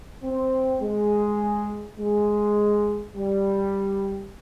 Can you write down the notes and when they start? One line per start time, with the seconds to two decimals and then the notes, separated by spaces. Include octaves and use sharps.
0.23 C4
0.81 G#3
1.98 G#3
3.15 G3